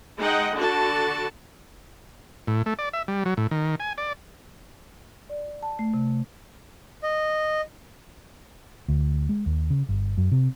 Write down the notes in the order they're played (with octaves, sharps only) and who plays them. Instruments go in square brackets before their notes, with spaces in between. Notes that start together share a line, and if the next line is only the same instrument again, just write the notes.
[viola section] G#3 D#4 D#5 F#5 G5
D3 D4 F#4 A4 A5
[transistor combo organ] A2
A3
D5
E5
G3
F#3
A2
D#3
G#5
D5
[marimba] D5
A5
A3
C3
[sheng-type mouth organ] D#5
[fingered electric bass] D2
G#3
D#2
C#3
G1
F#2
C3